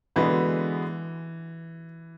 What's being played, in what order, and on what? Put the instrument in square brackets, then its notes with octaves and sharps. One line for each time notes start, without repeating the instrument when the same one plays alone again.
[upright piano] D3 G#3 B3 F#4 B4 [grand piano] E3